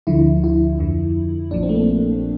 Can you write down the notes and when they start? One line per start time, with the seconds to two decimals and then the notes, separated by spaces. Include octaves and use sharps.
0.07 D2 D3 F3 E4
0.44 E4
0.79 F2 D3 F3
1.51 A#1 A#2 F3 D4
1.63 C4
1.69 A3
1.75 A#3